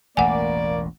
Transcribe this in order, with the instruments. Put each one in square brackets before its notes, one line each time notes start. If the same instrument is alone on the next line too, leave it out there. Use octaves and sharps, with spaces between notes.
[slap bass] E1 A1 A3 [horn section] A#3 D5 [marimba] F#5 G#5